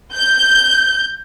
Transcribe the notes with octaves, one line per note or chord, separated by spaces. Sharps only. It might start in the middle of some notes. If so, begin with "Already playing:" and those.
G6